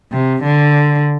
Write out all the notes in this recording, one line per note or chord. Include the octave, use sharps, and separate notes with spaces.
C3
D3